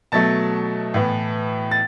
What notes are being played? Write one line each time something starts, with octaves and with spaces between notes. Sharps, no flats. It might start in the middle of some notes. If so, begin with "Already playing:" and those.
B2 F#3 A3 A5 A6
A2 E3 B3
A6